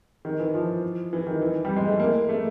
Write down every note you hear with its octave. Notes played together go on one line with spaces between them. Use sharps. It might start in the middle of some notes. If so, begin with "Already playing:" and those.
D#3
E3
F3
E3
D#3
E3
G3
G#3
A3
A#3
A3